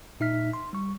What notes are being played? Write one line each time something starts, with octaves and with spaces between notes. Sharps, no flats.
A#2 D#4 E5 F6 B6
C6
G3 C#6